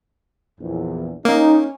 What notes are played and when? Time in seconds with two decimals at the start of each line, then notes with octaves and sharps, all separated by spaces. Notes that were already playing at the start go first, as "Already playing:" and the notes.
0.59 A#1 E2
1.25 A#3 C#4 D#4